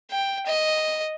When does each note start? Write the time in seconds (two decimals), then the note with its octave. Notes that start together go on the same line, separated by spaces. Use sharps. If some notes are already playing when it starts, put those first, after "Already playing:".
0.11 G5
0.47 D#5